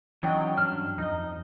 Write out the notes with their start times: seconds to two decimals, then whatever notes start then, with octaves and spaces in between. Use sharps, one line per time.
0.23 E3 F#3 C#4 D#4 D5 D#5 G5
0.57 G2 C#4 D4 F6
0.98 F2 D#4 D#5